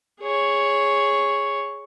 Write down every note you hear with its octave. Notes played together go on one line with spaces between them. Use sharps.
G#4 C#5